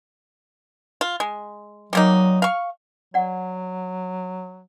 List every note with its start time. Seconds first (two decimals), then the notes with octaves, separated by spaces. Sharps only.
1.01 F4
1.20 G#3
1.93 F#3 G3 A#3 D#4
2.42 F5 C#6
3.14 F#3 D5 F#5